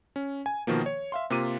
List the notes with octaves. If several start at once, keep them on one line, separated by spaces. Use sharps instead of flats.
C#4
G#5
B2 D#3 F3 A#3
C#5
E5 F5 C6
C3 A#3 F4 D6 D#7